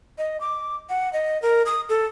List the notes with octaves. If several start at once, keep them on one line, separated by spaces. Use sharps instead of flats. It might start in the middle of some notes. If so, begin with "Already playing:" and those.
D#5
D6
F#5
D#5
A#4
D#6
A4